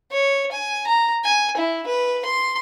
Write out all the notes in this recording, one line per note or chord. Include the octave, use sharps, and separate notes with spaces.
C#5
G#5
A#5
G#5
E4
B4
C6